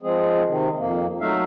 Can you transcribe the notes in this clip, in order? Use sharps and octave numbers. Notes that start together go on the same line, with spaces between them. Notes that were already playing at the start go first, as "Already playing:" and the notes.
F3 G#3 C4 G#4
C3 D#3
F2 A#3
F#3 A3 D#4 E5 F5